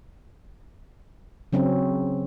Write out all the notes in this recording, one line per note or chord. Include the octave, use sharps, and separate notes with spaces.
C#3 F#3 C4 C#4